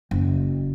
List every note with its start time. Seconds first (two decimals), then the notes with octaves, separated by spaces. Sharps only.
0.11 F#1